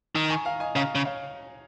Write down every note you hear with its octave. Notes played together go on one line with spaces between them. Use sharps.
D#3 A#5 D#6
G#5 C#6
F5 A#5
D#5 G#5
C#3 F5 A#5
C#3
C#5 F5